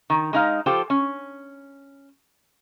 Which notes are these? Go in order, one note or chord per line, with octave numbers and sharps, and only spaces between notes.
D#3
G#3 D#4 F5
F3 F4 G4 A4 C5
C#4